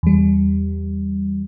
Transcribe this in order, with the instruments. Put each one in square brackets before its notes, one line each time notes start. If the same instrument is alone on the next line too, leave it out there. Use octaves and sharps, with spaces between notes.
[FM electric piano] E2 G3